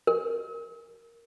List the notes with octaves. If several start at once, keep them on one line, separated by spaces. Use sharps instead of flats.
A#4